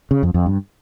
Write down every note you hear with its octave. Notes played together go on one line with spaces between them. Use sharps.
C#3
F2
F2
G2